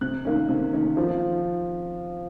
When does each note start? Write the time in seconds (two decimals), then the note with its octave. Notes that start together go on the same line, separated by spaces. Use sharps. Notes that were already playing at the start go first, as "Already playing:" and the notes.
0.01 C3 F#6
0.25 D#3 A#3 C#4
0.49 C3
0.73 D#3 A#3 C#4
0.97 F3